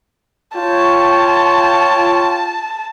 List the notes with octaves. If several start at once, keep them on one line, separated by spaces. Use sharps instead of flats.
F4 C#5 G5 A5